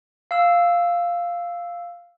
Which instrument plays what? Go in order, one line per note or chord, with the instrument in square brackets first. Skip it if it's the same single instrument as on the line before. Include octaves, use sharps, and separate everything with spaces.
[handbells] F5 E6